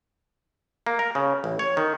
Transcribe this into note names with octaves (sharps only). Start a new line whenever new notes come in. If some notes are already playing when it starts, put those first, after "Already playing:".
A#3
A#4
C#3
A1
C#5
D#3